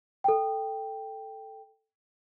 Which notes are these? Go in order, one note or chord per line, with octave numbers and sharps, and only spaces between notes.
A4 G5